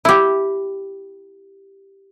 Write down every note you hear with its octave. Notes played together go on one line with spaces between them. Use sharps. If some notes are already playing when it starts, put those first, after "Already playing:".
E4 G4